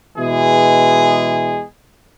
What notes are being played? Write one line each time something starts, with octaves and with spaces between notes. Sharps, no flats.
B2 E3 G#3 G#4